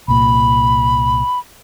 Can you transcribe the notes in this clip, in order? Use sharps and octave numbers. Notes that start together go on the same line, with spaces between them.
C2 A#2 B5